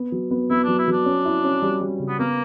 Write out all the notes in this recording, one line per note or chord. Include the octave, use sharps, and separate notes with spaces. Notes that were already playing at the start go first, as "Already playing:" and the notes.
Already playing: B3
F#3
B3
B3 E4
F#3 D4
E4
F#3 D4
C#4
E4
C#4
G3
G3
C#3
B3
A#3 B3